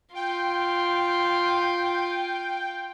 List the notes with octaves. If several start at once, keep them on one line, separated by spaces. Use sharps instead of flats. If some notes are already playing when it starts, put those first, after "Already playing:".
F4 G5